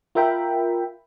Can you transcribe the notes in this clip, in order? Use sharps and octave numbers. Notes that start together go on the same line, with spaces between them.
F4 A#4 E5 G5 B5